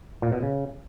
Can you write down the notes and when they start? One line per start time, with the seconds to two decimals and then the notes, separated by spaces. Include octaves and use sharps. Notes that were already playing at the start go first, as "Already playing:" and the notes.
0.22 A#2
0.32 B2
0.43 C#3